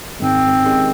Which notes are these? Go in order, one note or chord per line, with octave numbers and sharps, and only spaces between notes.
G#2 D#3 G#3 C4
D#3 G#3 C#4 G4